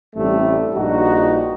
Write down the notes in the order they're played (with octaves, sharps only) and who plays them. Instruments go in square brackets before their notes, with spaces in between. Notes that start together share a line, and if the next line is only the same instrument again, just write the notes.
[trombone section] A1 G2 C3 G3 A3
A#1 G2 D#4 F#4